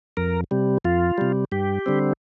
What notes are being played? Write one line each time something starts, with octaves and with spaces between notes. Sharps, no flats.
F2 A#4
C3 G3
F2 F4
C3 G3
G2 G4
D3 G3 C4